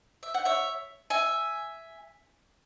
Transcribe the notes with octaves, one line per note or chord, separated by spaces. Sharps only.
E5
F#5
C#5 E5
E5 G#5